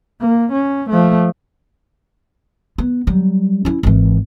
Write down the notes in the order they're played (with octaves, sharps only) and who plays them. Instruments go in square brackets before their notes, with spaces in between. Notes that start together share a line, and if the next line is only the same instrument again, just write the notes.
[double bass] A#3
C#4
F3 A3
[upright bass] B3
F#3 G3
C#4 E4
G#1 E3